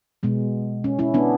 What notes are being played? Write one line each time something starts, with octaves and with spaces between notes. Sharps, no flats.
B2 G#3 B3
C#4
C#4 E4
B3 D4